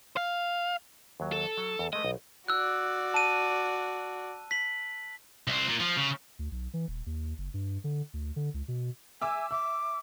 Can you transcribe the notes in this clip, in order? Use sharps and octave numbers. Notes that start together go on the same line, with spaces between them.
F5
D#2 F#3
A4
F#3
E2
G#3 A3 B4 D#5
B1
F#4 D5 E6 F#6
A5 D#7
B6 F#7
C2 C4
A#2
F3
C#3
D2
B1
E3
D#1
D#2
F#1
G2
D3
D2
D3
C#2
B2
E5 G#5 D6 E6
E5 D6